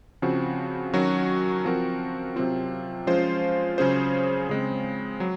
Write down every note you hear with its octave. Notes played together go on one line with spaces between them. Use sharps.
C#3 F3 C4 F#4
D#3 F#3 C#4 F#4
F3 C4 F#4 A#4
C3 F#3 C4 F4
F3 G#3 C#4 F4 C5
C#3 F#3 C#4 G#4 C5
C#3 G#3 C4
F#3